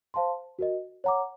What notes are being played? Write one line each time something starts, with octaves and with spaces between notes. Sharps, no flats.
C5 F5 A5 C6
F#4 A#4 D#5
C#5 F#5 A#5 D6